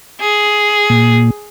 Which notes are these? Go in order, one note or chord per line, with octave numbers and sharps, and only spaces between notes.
G#4
A#2